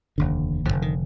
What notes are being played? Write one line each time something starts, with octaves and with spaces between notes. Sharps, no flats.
F1 D#2 D3
F1 D#2 D3 F3
D#3